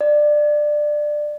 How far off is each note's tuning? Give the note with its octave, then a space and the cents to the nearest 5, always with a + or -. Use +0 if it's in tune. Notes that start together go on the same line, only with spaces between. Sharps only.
D5 +15